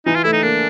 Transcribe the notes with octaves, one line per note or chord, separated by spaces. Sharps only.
E3 D#4
F4
A3 E4
D#4
A#3 D4